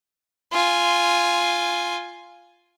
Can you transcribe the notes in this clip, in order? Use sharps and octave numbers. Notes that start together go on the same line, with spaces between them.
F4 G#5